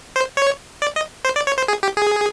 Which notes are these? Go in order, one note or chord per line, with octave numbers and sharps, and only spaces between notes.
C5
C#5
D5
D#5
C5
D5
C#5
C5
G#4
G4
G#4